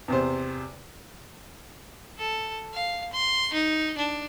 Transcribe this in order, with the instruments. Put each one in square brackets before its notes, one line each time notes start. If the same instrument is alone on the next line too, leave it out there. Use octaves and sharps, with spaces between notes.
[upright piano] E2 C3 C5
[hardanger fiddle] A4
F5
C6
D#4
D4